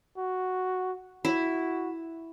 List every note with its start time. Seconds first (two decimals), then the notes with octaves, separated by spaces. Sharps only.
0.18 F#4
1.25 E4 F#4